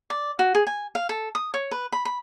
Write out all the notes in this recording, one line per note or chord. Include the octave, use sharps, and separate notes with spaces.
D5
F#4
G#4
G#5
F5
A4
D#6
C#5
B4
B5
B5